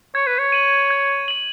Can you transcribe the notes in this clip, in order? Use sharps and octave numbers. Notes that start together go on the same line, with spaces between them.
C#5 G#6
B4
C#5
D#7 F#7
G#6
D#7 F#7